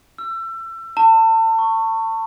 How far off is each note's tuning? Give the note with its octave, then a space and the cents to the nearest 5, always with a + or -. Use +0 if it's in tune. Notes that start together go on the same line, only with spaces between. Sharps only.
E6 +30
A5 +35
C#6 -10